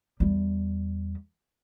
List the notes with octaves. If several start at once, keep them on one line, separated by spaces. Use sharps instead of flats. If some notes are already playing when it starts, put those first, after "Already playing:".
E2 G3